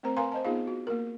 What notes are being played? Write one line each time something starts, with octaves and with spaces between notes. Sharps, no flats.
A3 C4 A#4 C5 A#5
A#4 B4 F5 G#5 A#5 C6
C5 D#5 A5
B3 D#4 F4 G#4 F5
F#4
A#3 A#4